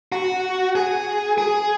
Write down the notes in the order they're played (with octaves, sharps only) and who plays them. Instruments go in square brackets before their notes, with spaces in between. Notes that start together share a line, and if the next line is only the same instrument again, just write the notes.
[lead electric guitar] F#4
G#4
G#4